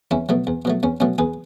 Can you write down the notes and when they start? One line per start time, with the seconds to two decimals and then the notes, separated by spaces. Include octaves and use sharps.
0.11 E2 C#4 E4
0.29 B2 F#3 A3
0.47 E2
0.65 B2 F#3 A3
0.83 E2 C#4
1.00 B2 F#3 A3 C#4
1.18 E2 G#4 B4